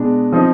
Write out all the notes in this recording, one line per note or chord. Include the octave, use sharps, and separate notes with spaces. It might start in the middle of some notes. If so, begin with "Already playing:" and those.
Already playing: B2 G#3 D4
F3 C4 D#4 D#6